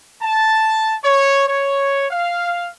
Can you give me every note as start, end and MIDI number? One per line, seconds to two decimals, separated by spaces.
0.22 0.94 81
1.03 1.47 73
1.48 2.06 73
2.11 2.69 77